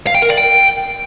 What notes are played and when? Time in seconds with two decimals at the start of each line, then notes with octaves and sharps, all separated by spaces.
0.07 F5
0.15 G5
0.22 A#4
0.30 D5
0.37 G5